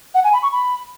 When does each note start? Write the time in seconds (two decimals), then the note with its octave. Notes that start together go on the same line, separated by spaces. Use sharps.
0.15 F#5
0.24 G#5
0.33 B5
0.43 C#6
0.52 B5